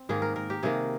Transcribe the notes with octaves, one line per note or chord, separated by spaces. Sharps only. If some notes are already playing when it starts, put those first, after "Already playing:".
Already playing: C4
G#2 D#3 A#3 G#4
A#4
A#4
G4
C3 D#3 A#3 G#4